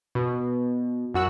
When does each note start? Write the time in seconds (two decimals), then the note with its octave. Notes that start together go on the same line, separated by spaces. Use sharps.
0.15 B2
1.14 F#2 F#4 E6 F#6